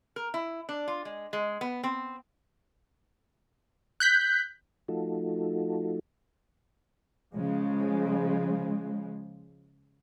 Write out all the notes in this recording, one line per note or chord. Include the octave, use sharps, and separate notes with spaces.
A#4
E4
D4
F4
G#3
G#3
B3
C4
F#6 G6 B6
F3 A3 D#4 F4 F#4 A4
C#3 F3 G#3